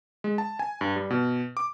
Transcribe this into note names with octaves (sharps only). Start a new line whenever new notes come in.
G#3
A5
G#5
G2
G3
B2
D6